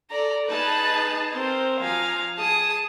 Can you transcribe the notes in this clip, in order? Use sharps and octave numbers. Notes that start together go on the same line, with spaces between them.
A4 D5 A#5
D#4 G#4 B4 A5 F#6
C4 A#4 C5
F3 F5 G#5 A#5
G#4 A5 D#6